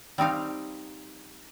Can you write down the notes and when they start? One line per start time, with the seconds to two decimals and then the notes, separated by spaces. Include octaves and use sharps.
0.18 G3 C4 D#4 F5